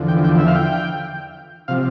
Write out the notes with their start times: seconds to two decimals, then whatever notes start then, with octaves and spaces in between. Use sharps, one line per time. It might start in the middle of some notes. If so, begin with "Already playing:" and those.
Already playing: E2 D3 F3
0.08 G5
0.24 G5
0.38 E5
0.47 F5
0.56 G5
1.68 C3 F3 F5